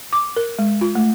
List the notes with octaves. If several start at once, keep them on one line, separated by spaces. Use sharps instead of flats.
D6
A#4
G#3
F4
A3